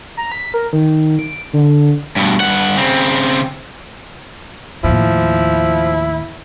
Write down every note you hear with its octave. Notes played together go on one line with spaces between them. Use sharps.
A#5
B6
A#4
D#3
D7
D3
G2 B2
G2 F#5
C#3 C4
D#2 A2 F3 E4